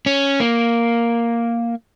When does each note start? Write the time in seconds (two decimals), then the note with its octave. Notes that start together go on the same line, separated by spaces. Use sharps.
0.06 C#4
0.40 A#3